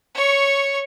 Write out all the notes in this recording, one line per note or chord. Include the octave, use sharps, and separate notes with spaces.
C#5 C#6